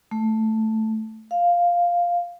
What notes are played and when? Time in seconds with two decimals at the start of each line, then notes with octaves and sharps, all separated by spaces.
0.11 A3
1.31 F5